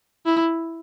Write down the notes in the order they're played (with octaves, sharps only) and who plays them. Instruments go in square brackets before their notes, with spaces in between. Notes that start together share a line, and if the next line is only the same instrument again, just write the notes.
[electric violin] E4